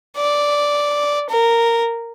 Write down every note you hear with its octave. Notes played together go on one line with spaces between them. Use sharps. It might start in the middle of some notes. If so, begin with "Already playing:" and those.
D5
A#4